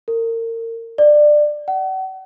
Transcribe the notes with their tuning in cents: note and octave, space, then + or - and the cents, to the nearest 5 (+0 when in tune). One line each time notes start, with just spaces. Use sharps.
A#4 -35
D5 +20
F#5 +40